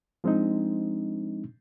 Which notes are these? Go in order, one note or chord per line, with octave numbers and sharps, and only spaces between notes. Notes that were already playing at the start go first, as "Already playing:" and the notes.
F3 G#3 C4 D4 D#4